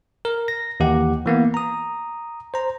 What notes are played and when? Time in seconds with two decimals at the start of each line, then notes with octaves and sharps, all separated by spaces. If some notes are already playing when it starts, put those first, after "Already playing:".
0.25 A#4
0.48 A#6
0.80 D#2 E3 G4 F#5
1.26 E3 A#3 B3
1.54 A#5 D#6
2.54 C5 A#5